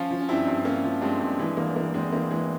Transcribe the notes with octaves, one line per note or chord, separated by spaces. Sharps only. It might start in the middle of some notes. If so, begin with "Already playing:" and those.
Already playing: F3 C#4 F4
F3
C#4
G2 C4 E4
G2
G2 A#3 C#4
F3
G2 G#3 C4
G2
E3 G#3
E2 A#3
E3 A#3
E2 G#3 C4
E3 A#3
E3 G#3